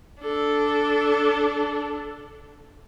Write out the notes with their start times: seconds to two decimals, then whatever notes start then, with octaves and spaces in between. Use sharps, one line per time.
0.21 D4 A4